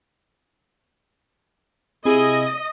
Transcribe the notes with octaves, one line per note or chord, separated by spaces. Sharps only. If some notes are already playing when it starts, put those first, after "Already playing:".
C3 E4 G#4 D#5